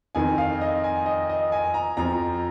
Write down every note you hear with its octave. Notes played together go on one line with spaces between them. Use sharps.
F2 D#3 G#5
F5
D#5
G#5
D#5
D#5
G#5
A#5
F2 F3 A#5